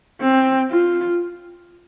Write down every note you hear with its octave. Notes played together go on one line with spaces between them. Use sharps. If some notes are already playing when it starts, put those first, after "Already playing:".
C4
F4